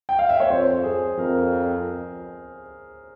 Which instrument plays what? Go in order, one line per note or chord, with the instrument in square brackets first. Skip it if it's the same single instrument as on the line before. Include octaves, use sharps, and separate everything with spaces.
[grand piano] G5
F5
E5
C#5
[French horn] F2 [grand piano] C5
[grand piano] G#4
[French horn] F2 [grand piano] A#4